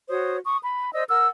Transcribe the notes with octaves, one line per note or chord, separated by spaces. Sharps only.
F#4 C5 C#5 D#6
C#6 D#6
B5
C5 D5 D#5 E6
A#4 F#5 E6 F6